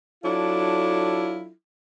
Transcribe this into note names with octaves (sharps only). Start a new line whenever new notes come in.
F#3 D4 E4 F4 A4